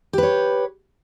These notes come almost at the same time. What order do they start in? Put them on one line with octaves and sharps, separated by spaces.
G4 B4 C#5